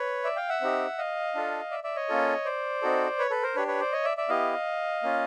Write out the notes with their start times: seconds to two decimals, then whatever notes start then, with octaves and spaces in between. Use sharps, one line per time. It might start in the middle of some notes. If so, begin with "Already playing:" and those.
Already playing: B4 C#5
0.24 D5 E5
0.36 F5 G5
0.49 E5 F#5
0.61 C4 D#4 G4
0.98 D#5 F5
1.35 D4 F4 A4
1.71 D5 E5
1.84 D5 E5
1.96 C#5 D#5
2.09 A#3 C#4 F4 A4
2.45 C5 D5
2.82 C4 D#4 F#4 A4
3.19 B4 C#5
3.30 A4 B4
3.43 A#4 C5
3.55 D4 G4 B4 C#5
3.68 B4 C#5
3.80 C5 D5
3.93 C#5 D#5
4.05 D5 E5
4.17 D5 E5
4.29 B3 E4 G4 D#5 F5
5.03 A#3 C#4 F4